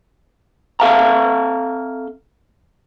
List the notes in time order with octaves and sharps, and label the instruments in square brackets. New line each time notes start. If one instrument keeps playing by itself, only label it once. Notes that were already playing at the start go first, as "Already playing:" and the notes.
[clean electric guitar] C4 A4 E5 F5 A5 A#5